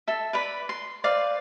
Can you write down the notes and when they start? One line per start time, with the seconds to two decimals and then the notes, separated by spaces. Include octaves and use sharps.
0.08 A4 E5
0.33 B4 D5 B5
0.69 C6
1.04 B4 C5 D5 F5